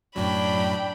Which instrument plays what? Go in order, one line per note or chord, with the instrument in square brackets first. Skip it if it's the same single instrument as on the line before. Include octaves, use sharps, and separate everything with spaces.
[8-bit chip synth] F#2 A2 F#3 [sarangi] D4 [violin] G5 B5